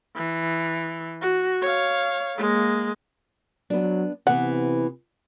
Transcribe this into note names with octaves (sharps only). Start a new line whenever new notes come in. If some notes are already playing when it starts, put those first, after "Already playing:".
E3
F#4
C#5 F5
G#3 A#3
F#3 B3 D4
C3 E3 B3 F#5